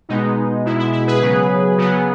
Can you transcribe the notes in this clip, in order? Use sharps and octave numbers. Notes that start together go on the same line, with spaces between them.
B2 G#3 B3 D#4
B2 G#3 B3 E4
E4
E4
G#4 B4
C#3 F#3 B3
C#3 F#3 B3